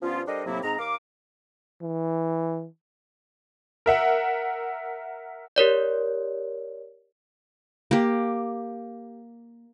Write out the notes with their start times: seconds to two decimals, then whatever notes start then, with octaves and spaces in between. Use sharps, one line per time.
0.02 G2 F3 B3 C#4 F4
0.27 G3 D4 A4 A#4 C5 D#5
0.45 A2 C3 F#3 A#3 C4 E4
0.63 G#2 G#3 C4 A#5
0.79 D#2 A#4 F5 D6
1.82 E3
3.86 A#4 E5 F#5
5.56 G4 A#4 C#5 D5
7.91 A#3 G4